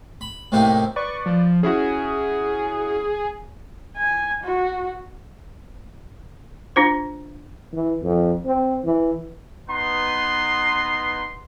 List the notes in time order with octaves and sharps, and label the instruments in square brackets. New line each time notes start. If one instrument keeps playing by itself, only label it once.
[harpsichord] B5
A2 C3 A#3 D#4 E4
[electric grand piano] B4 D5 [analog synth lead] C#6
[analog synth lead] F3
[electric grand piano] C#4 E4 F#4 [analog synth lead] G#4
[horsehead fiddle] G#5
F#4
[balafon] D4 F4 C5
[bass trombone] E3
F2
C4
E3
[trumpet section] B3 D#4 B4 A#5 C6